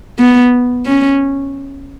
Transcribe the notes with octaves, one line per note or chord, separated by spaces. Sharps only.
B3
C#4